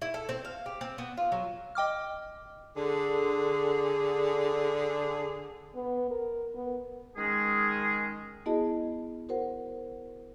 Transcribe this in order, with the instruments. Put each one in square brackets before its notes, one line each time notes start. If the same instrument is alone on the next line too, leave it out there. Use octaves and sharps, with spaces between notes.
[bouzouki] E4
A4
C4
F5
G4
C4
B3
F4
F#3
[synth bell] D#5 G5 D6 F6
[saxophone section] D3 G#4
[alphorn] B3
A#4
B3
[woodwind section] D#3 G#3 C#4 G#4
[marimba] B3 E4 F#4 G#4 D#5 A5
F#4 A#4 C5 F#5